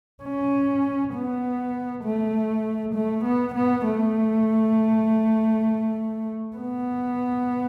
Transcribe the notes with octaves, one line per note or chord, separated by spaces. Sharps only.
C#4
B3
A3
A3
B3
B3
A3
B3